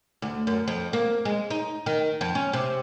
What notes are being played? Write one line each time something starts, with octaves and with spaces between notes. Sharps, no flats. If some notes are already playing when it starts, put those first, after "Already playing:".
D2
F#2
F2
A#3
G#3
D#4
D#3
F2
C#4
C3